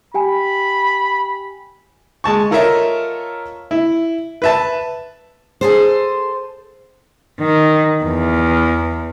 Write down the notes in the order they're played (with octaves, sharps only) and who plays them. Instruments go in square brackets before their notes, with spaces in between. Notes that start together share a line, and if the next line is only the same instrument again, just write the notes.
[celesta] G4 G5 G#5 [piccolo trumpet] B5
[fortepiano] G#3 A5 C#6
F4 A4 A#4 C#5 D#5 E5
E4
B4 E5 A5
[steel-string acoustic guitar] G#4 A4 C5
[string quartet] D#3
E2